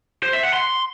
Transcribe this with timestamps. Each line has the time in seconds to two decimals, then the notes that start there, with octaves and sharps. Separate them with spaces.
0.23 C5
0.33 E5
0.43 F#5
0.53 C6